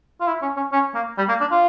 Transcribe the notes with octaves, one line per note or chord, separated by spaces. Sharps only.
F4
E4
C#4
C#4
C#4
A#3
G3
A#3
D4
F4